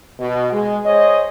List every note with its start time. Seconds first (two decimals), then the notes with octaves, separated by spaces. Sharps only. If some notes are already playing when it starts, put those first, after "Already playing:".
0.20 B2
0.53 G#3
0.86 G#4 C5 C#5 D#5